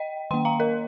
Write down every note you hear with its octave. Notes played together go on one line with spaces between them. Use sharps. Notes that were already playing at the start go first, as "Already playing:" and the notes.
Already playing: D#5 G5
D#3 A#3 G5 C6
F5 A#5
A#4 D#5